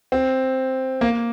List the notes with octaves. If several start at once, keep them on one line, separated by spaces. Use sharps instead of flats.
C4
A#3